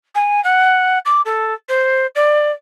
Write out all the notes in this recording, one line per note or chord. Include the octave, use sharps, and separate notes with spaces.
G#5
F#5
D6
A4
C5
D5